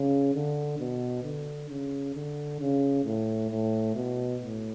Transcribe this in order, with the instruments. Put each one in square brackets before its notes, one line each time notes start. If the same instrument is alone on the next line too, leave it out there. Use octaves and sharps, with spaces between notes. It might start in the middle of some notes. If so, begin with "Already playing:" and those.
Already playing: [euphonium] C#3
D3
B2
D3
C#3
D3
C#3
A2
A2
B2
A2